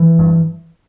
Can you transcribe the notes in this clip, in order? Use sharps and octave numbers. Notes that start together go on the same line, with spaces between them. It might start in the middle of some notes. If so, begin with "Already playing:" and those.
Already playing: E3
G2